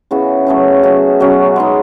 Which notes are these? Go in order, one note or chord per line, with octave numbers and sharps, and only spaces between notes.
C#3 E3 B3 F#4
F#3 A3 C#4 G#4
F#3 C#4 F#4
B2 F#3 C#4
G#3 B3 D#4